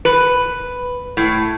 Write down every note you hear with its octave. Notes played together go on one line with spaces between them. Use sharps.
B4
A2